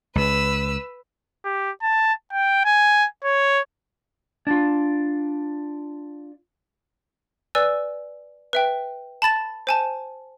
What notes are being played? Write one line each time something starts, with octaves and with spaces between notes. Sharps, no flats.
C#2 B4 E6
G4
A5
G5
G#5
C#5
D4 F4
B4 D5 G#5 E6
B4 E5 G5
A5 B5 A6 E7
C5 G#5 A5